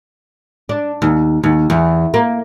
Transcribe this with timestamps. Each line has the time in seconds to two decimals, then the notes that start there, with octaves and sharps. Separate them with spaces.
0.69 D4
1.02 D#2
1.43 D#2
1.70 E2
2.14 A#3